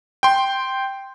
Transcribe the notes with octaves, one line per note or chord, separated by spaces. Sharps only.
G5 C6